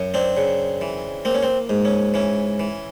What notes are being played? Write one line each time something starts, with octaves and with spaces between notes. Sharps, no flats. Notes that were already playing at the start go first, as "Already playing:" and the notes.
Already playing: F#2
C4 D4
C#3
E3
A#3 C4
C#4
C4
G#2
C#4
E3 C#4
E3